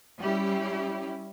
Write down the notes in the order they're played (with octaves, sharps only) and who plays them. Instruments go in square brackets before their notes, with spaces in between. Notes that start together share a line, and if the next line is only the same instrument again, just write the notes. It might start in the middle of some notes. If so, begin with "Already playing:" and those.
[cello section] G3 C#4 E4 G4